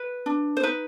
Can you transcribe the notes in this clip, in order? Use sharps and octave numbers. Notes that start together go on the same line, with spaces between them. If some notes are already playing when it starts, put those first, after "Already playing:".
Already playing: B4
D4
C5
D#4 B4